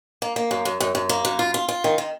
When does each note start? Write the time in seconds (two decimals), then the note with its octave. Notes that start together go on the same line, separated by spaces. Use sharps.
0.22 A#3
0.36 A#3
0.51 F#2
0.65 F#2
0.80 F#2
0.95 F#2
1.09 A#3
1.25 F#2
1.39 F4
1.54 F4
1.69 F4
1.84 D#3
1.98 D#3